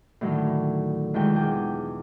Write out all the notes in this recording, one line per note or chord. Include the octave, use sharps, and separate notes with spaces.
A2 D3 D#3 F#3
E2 B2 D#3 G#3 F4 G5
G#4 G5 D6 G6